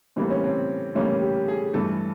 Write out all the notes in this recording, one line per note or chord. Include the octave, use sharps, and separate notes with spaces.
A2 E3 G3 A#3 C4
C#4
C4
A2 E3 G3 A#3 C#4
G4
G#4
G2 E3 A3 A4